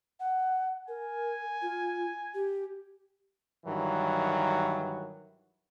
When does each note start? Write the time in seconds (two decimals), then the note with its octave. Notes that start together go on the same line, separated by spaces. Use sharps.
0.20 F#5
0.88 A#4 G#5
1.62 F4
2.34 G4
3.66 G2 D#3 E3 F#3